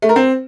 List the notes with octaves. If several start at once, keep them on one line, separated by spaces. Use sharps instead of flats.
A3
A#4
C4